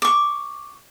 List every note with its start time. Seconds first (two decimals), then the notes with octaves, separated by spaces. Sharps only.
0.02 C#6 D6